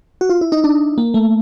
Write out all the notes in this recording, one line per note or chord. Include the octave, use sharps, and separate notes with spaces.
F#4
F4
E4
D#4
D4
A#3
A3